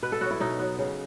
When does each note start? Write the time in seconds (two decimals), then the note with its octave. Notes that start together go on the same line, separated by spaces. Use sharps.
0.02 B2 B4
0.12 A4
0.21 F#3 B3 F#4
0.31 E4
0.40 B2 D#4
0.59 F#3 B3
0.78 C#3